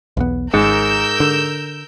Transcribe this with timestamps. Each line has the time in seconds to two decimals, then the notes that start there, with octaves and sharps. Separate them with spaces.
0.17 B1 E2 B3
0.54 G#1 G#2 A#4 E6 G6
1.20 D3